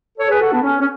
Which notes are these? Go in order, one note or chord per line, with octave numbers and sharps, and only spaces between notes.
A4 C#5
G#4 B4
F#4 A4
B3 D4
C#4
C#4